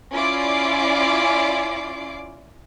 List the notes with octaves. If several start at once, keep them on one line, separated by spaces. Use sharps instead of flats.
C#4 E4 F4 D5 D6 C7